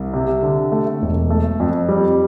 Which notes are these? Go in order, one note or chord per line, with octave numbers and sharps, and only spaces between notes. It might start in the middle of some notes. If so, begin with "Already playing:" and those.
Already playing: C2
C3
D3
A3
E1
A3
F2
G3